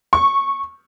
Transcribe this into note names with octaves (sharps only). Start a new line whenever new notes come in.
C#6